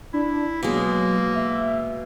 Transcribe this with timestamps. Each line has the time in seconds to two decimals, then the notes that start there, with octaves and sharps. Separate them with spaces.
0.13 D4 E4
0.63 B2 F#3 G#3 A#3
1.35 E5